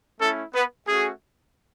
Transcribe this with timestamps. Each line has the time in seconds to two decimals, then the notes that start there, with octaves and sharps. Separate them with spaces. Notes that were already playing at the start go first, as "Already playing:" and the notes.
0.20 A3 C#4 E4 A4
0.54 B3 B4
0.87 A3 C#4 F#4 G#4